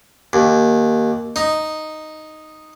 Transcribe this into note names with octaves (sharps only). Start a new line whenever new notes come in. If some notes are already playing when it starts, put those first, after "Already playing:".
D#2
D#4